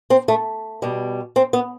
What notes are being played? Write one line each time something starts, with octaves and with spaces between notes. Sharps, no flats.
C4
A3
B2 G3
C4
B3